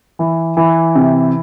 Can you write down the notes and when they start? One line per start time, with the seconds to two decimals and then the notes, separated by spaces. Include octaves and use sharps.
0.19 E3
0.57 E3
0.95 C3